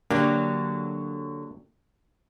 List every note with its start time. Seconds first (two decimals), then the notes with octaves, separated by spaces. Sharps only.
0.11 D3 F#3 A#3 D4 G4